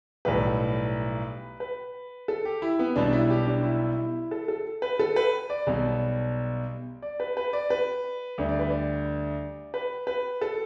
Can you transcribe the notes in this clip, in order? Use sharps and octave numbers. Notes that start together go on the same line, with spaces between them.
B1 A2 G3 B4
B4
A4
G4
E4
B3
B1 B2 G3 D4
E4
G4
D4
E4
A4
A4
B4
A4
B4
D5
B1 B2 G3
D5
B4
B4
D5
B4
D2 D3 G3
D5
B4
D5
B4
B4
A4